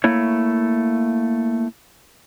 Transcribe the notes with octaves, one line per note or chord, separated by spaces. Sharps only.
A3 A#3 E4 C#5